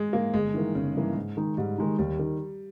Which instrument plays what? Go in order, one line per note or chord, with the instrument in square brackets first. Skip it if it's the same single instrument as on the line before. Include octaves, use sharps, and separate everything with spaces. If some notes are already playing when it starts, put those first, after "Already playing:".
Already playing: [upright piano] G#3
[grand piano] G#2 E3 [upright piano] A#3
[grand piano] G1 [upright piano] G#3
[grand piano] G2 E3 A#3 [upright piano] D#3
[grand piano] G1 [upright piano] C#3
[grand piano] G2 E3 A#3
G#2
D#3 G#3 D#4
[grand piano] G#2 [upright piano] G3
[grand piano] D#3 G#3 D#4
[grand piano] D#2 [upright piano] G3
[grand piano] D#3